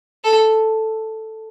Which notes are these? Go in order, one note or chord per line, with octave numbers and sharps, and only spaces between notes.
A4